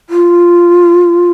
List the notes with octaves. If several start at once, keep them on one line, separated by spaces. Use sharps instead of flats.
F4